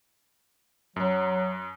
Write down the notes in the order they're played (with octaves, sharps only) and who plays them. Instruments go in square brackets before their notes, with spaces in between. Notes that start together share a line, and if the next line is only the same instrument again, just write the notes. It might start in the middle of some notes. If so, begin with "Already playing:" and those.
[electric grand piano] F#2 [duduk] F#3